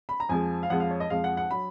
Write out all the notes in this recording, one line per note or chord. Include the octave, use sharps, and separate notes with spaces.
B5
A#5
F2 F3 G#3 G#5
F5
F2 F3 G#3 F#5
F5
C#5
D#5
F2 F3 G#3 F5
F#5
F#5
F#3 B5